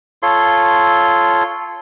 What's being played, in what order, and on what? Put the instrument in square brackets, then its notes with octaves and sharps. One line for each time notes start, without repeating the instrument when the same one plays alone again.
[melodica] F4 A4 C#5 C6